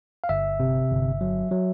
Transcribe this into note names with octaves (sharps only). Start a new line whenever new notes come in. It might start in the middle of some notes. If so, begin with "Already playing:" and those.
F5
G1 E5
C3
G1
F#3
F#3